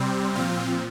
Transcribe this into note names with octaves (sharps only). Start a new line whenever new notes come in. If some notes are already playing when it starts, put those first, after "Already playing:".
Already playing: C3 G3 C4
A#2 F3 C4 F4